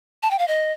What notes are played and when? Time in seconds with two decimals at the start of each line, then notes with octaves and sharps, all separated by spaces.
0.23 A5
0.31 G5
0.39 F5
0.48 D#5